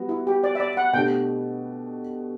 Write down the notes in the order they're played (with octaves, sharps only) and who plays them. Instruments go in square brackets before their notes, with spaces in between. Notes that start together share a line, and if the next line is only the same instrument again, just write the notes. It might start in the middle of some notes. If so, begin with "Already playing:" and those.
Already playing: [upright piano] G3 B3 F#4
[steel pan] E4
G4
D5
E5
D5
F#5
[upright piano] B2 A3 D4 G4 [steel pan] G5